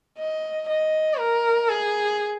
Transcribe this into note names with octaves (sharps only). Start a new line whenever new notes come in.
D#5
D#5
A#4
G#4